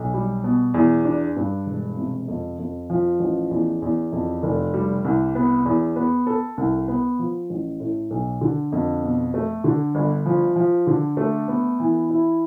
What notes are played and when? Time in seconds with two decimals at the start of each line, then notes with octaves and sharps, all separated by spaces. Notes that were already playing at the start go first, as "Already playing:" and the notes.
Already playing: B1
0.14 G3
0.44 B2
0.74 E2
1.05 D4
1.36 G2
1.66 E1
1.97 C3
2.28 F2
2.59 F2
2.90 F3
3.20 A1
3.51 E2
3.82 E2
4.12 F2
4.43 F1
4.74 G3
5.05 C2
5.35 B3
5.65 E2
5.96 B3
6.27 A4
6.57 C2
6.88 B3
7.19 F3
7.50 A1
7.80 A2
8.10 B1
8.41 D3
8.72 F2
9.03 B2
9.34 A3
9.64 D3
9.95 G1
10.26 F3
10.56 F3
10.87 D3
11.17 A3
11.48 B3
11.80 E3
12.10 E4